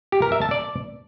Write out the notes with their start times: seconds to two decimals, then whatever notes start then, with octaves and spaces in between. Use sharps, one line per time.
0.12 G4
0.22 A#4
0.32 E5
0.42 A5
0.51 D5